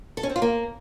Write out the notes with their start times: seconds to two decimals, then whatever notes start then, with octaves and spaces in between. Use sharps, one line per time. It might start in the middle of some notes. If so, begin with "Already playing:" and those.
0.17 A4
0.23 C#4
0.29 C4
0.36 F4
0.42 A#3